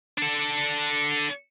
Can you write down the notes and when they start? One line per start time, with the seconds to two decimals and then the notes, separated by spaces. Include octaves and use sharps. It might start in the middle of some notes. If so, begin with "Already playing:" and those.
0.18 D4 A4